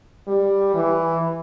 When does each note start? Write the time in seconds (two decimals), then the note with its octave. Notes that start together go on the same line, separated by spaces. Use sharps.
0.27 G3
0.75 E3